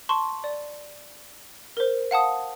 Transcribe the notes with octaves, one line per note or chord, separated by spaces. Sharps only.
A5 C6 C#6
D5
A#4 C5
F5 F#5 A5 D#6